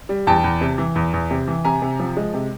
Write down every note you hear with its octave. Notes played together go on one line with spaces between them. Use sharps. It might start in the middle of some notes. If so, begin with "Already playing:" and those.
G3
E2 G5 A5
E2
C3
E3
E2
E2
C3
E3
C3 G#5 A#5
C3
F3
G#3
C3